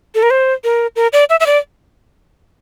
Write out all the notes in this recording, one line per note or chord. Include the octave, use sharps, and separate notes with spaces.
A4
A#4
C5
A#4
A#4
D5
E5
E5
D5